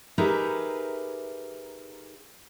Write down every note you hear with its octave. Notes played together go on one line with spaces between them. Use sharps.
D#4 G4 G#4 A#4 B4 E5